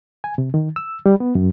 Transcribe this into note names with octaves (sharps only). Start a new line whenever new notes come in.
G#5
C3
D#3
E6
G3
B3
F#2